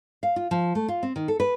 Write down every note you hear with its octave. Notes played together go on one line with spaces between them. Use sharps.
F5
F4
F3
A3
F4
C4
D#3
A4
B4